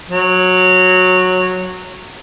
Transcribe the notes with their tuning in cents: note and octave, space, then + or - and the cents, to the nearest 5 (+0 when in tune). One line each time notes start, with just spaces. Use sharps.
F#3 -10